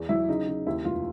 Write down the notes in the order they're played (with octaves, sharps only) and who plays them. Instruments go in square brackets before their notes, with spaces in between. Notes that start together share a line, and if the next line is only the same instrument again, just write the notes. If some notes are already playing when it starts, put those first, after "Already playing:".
Already playing: [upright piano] E2
F#3 E4
C#3 D#4
C#3
D#2 E4
F1 F4